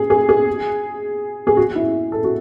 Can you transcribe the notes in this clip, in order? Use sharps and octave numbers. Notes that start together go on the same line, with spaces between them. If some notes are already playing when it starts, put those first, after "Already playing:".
Already playing: G#4
G#4
G#4
G#4
F#4
E4
A4
F#4